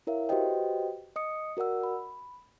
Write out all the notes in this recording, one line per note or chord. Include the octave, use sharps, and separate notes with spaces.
E4 A#4 C#5 E5 F5
F#4 G4 B4 C5 D#5 G5
D#5 D#6 C#7
F#4 A#4 D5 F#5 E6
B5